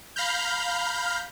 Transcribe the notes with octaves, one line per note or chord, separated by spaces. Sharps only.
F5 A#5 B5 F6 G6